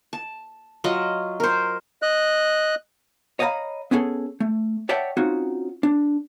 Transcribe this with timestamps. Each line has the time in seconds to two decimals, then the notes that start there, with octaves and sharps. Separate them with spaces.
0.13 A5
0.84 F#3 F4 D#5
1.40 A#4 C5
2.02 D#5 F#6
3.39 C#5 D#5 F5 G5 A#5 B5
3.91 B3 C#4 D#4 G#4 A4
4.40 A3
4.89 C#5 D5 E5 F#5 G5 A5
5.17 C4 C#4 D#4 F4 F#4
5.83 D4